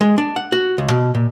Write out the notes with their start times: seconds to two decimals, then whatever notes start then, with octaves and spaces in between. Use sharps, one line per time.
0.01 G#3
0.18 D4
0.36 F#5
0.52 F#4
0.78 C#2
0.90 B2
1.15 A#2